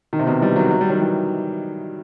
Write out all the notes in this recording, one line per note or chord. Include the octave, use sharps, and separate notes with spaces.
D#3
C3
B2 D#3
E3 G3
D#3 F#3
F#3
G3
D#3 F#3
E3 G3